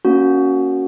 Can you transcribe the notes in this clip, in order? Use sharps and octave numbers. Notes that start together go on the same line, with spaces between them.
A#3 C#4 F#4